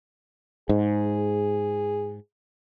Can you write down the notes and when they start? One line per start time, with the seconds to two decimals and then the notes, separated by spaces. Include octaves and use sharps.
0.69 G#2 G#4